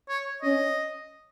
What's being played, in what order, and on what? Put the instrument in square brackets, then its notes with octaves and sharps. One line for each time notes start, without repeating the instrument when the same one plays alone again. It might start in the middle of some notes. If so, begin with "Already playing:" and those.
[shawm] C#5
[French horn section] C#4 [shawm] D#5